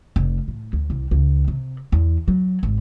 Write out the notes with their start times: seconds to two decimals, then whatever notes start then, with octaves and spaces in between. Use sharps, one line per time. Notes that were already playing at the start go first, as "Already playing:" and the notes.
0.16 F1
0.48 A2
0.73 D2
0.90 C2
1.11 C#2
1.48 C3
1.92 E2
2.28 F#3
2.63 G#1